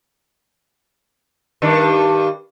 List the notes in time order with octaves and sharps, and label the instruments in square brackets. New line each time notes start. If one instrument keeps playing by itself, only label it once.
[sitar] G2 D#3 D4